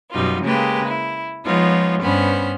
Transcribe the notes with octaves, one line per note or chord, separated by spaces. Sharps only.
F#2 B2 G3 D#4 F4
C#3 G#3 A#3 G4 B4
E4
F3 G#3 B3 D#4 F4 C#5
G2 B3 C#4 C5 B5 F6